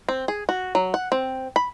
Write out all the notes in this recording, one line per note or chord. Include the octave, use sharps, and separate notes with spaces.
C4
G#4
F#4
F#3
F#5
C4
B5